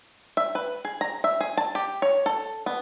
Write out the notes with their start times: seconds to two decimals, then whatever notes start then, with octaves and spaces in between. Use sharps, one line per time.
0.37 E5
0.55 B4
0.85 G#4
1.01 A#5
1.24 E5
1.40 G#4
1.57 A5
1.75 G4
2.02 C#5
2.26 A4
2.66 B3